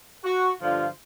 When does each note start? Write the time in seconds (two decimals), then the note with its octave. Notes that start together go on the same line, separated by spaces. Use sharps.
0.24 F#4
0.62 G2 D3 F3 F4